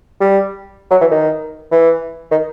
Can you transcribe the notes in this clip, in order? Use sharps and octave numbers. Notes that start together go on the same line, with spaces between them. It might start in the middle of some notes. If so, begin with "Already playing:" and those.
G3
F#3
E3
D#3
E3
D#3